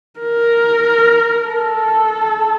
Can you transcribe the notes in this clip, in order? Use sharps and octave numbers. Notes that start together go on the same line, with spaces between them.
A#4
A4